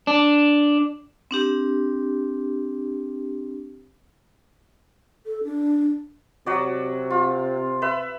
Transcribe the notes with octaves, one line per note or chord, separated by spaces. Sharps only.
D4
C4 D4 G4
A4
D4
C3 F#3 F#4 D5
F4
B4 E5